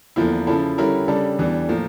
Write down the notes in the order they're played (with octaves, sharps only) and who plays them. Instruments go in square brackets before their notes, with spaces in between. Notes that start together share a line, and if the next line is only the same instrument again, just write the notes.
[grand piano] E2 D3 F3 A#3 E4
C#3 F3 C#4 E4 A4
D3 G3 C#4 E4 A#4
C#3 G3 D4 A4
E2 E3 G3 D4
A2 F3 A#3